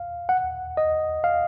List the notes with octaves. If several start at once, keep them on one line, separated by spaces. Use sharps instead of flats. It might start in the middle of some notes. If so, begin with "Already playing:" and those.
Already playing: F5
F#5
D#5
F5